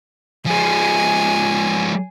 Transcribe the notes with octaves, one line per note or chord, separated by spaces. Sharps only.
F3 G#3 G#5